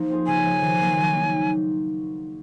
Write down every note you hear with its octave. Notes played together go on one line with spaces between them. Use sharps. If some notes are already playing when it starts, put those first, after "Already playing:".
Already playing: F3 A#3 D#4
C4 F4 G#4
C#3 G#5
F3 G#3
D#3
F#3 A#3 F4
F#3
A#3 D#4